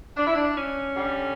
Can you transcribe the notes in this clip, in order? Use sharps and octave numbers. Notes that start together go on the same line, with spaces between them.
D4
E4
D4
C#4
D3 G3